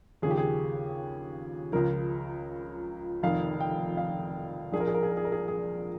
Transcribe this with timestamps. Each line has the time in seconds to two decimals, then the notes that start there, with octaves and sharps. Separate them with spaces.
0.22 D#2 C#3 F3 G#4
0.31 G4
0.37 G#4
1.72 C#2 C#3 F3 A#4
3.23 F1 F2 D#3 F5
3.60 G5
3.97 F5
4.72 A#1 A#2 F3 G#4
4.80 A#4
4.87 G#4
4.95 A#4
5.03 G#4
5.10 A#4
5.17 G#4
5.25 A#4
5.32 G#4
5.48 G#4